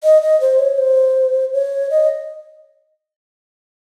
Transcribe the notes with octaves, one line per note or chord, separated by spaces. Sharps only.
D#5
D#5
C5
C#5
C5
C#5
D#5